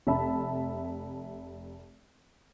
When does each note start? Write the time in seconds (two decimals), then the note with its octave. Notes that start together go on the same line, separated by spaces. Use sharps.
0.07 F1 E5 A5 B5